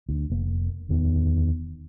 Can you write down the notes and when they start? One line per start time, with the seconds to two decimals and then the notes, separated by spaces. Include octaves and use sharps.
0.09 D2
0.30 F1 A#3
0.89 D1 E2 D#3 B3